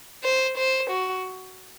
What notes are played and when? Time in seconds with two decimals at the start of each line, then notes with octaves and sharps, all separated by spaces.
0.23 C5
0.57 C5
0.90 F#4